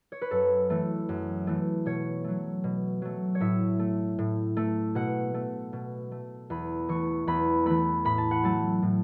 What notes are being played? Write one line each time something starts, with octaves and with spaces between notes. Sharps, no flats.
C#5
B4
F#2 A4
E3 A3
F#2
E3 A3
B2 C#5
F#3 A3
B2
F#3 A3
C#5
A2 E5
A3
A2
A3
B2 F#5
A3
B2
A3
E2 B5
E3 A3 C#6
E2 B5
E3 A3 B5
A2 B5
A5
F#5
F#3 A3 A5
A2